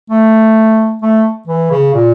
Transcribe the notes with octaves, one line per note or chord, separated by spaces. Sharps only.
A3
A3
E3
C#3
A#2